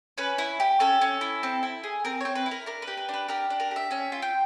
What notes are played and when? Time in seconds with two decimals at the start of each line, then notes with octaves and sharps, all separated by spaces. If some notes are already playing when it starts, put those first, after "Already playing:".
0.18 C#4 B4
0.38 E4
0.60 G4
0.80 C#4 A4
1.01 C#4
1.21 E4
1.43 C4
1.63 E4
1.83 G#4
2.05 C4 A#4
2.21 C4 C#5
2.35 B4
2.46 E4
2.51 A#4
2.66 D4 A#4
2.82 B4
2.88 G4
2.97 B4
3.09 D4 B4
3.28 G4 A#4
3.50 D4
3.60 A#4
3.71 G4 E5
3.91 C#4 E5
4.12 F4
4.22 G5